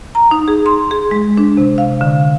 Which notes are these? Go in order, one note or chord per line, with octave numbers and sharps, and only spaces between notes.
A#5
D#4
G#4
C6
G#4
G#3
D4
C3
F5
D3